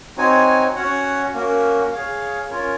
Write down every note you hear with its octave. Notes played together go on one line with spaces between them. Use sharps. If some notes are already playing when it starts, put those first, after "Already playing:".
C4 D#4 F#4 C#5 G#5
C#4 F#4 C#5 F#5
A#3 C#4 F#4 A#4
G#4 C#5 F5
C#4 F4 A#4 C#5